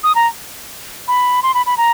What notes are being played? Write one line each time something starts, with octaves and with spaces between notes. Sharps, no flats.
D#6
A#5
B5
C6
B5
B5
A#5